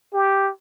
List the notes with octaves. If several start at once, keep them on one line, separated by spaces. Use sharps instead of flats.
G4